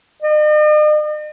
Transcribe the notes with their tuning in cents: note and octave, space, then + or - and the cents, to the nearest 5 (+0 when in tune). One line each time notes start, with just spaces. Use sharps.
D#5 -45